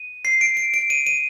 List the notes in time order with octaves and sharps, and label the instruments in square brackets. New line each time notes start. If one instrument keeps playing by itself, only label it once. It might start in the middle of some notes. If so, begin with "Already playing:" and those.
Already playing: [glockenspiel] D#7
C7
D7
D7
D7
D#7
D#7